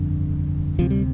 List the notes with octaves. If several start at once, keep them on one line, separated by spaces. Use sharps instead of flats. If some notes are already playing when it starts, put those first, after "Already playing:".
Already playing: G1 F2 D3
D2 C3 F3
G3